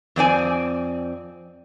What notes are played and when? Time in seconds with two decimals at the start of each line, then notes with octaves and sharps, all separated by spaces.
0.16 F2 C4 D5 G#5